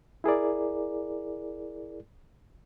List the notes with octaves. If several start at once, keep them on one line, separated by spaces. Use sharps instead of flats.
E4 G#4 A#4 D5